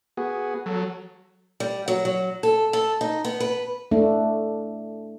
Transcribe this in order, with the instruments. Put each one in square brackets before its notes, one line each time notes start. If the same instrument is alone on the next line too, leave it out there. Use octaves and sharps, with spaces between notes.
[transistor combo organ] B3 F#4 G#4
[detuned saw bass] F#3 [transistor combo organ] A4
[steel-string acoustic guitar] G3
F#3
F#3
A4
A4
D#4
B3
B4
[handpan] A3 D4